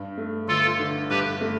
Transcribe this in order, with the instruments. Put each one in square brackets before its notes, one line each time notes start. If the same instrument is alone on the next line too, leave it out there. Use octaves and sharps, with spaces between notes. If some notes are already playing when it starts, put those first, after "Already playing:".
Already playing: [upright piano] G2
A3
[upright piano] G1 [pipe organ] F4 A4
[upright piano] D3
[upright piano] G2 [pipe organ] G4 B4
[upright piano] A3